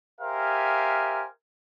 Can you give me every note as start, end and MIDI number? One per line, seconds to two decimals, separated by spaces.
0.21 1.26 67
0.21 1.26 70
0.21 1.26 72
0.21 1.26 76
0.21 1.26 77
0.21 1.26 80